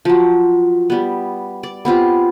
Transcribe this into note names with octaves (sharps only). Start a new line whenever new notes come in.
F3 F#3
G3 B3
D5
B3 C4 F4 G4